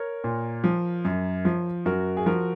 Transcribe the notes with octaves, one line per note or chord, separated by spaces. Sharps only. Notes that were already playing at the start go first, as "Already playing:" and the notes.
Already playing: A#4 C#5
A#2
F3
F#2
F3
F#2 F#4 A#4
G#4
F3 F#4 A#4